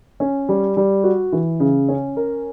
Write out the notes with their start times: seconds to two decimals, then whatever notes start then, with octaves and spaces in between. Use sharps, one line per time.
0.20 C#4
0.49 G3
0.77 G3
1.04 F#4
1.32 E3
1.60 C#3
1.89 C#4
2.17 A#4